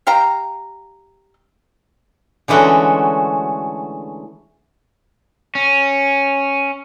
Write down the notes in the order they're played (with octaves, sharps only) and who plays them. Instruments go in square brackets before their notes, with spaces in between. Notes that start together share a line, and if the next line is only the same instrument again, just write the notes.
[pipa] G4 F5 G5 A#5
[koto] D3 E3 G#3 A3 C#4 F#4
[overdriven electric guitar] C#4